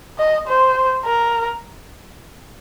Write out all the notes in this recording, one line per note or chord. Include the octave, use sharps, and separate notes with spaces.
D#5
C5
A#4